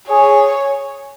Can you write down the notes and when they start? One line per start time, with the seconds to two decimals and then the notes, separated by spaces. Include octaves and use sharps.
0.08 G#4 C#5